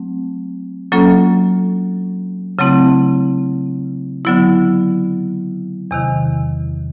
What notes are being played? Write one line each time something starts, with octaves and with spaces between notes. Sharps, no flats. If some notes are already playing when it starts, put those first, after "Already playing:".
Already playing: F#3 A3 C4
F#3 A#3 C#4 F4 A4
C#3 F#3 A3 C4 E4
D3 F#3 B3 E4
E2 C3 D#3